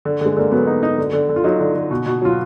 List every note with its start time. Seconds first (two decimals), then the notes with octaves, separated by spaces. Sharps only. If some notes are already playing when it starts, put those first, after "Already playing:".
0.05 D3
0.21 D3 G#3
0.37 D3 A#3
0.52 F#3 B3
0.67 D#4
0.83 D#4
0.98 D3
1.13 D3
1.29 D3
1.36 F4
1.44 F#3 D#4
1.59 D3
1.75 D3
1.91 B2
2.06 B2
2.21 F#3 F4